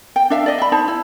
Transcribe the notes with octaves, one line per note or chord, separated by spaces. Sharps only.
G5
D4 E5 F5
D5 D#5
E5 B5
D#4 C5 A5
E4